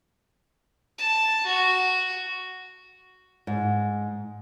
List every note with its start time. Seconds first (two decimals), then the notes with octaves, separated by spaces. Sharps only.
0.98 A5
1.46 F#4
3.47 G#2